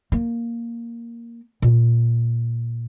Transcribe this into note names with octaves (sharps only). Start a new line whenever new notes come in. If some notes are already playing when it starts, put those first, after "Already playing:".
A#3
A#2